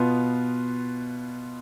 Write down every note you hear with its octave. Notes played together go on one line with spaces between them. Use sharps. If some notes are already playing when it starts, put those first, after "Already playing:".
Already playing: B2 B3 F4